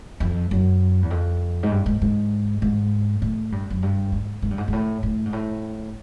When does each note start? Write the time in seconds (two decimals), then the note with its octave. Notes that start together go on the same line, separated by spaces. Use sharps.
0.20 F2
0.51 F#2
1.02 E2
1.11 F2
1.63 G#2
1.72 G2
1.86 G#2
2.02 G#2
2.62 G#2
3.22 A2
3.52 G2
3.70 F#2
3.83 G2
4.12 G#2
4.42 G#2
4.51 G2
4.58 G#2
4.68 G#2
4.73 A2
5.03 A2
5.25 G#2
5.33 A2